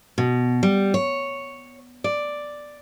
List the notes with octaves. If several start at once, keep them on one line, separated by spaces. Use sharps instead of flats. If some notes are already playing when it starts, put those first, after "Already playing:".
B2
G3
C#5
D5